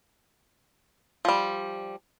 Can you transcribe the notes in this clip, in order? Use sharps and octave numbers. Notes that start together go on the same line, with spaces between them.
F3 G3